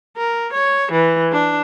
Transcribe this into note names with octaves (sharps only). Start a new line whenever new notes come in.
A#4
C#5
E3
D4